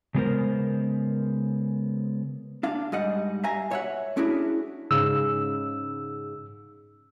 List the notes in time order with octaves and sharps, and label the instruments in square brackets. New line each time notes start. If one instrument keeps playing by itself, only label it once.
[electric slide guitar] C#3 G#3 B3 G4 A#4 C5
[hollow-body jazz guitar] D4 F5
G#2 G3 D#5 F#5
E5 F5 G#5 A#5
C#5 E5 F#5
C#4 D4 E4 F#4 G#4
[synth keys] G#2 C#3 [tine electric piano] E6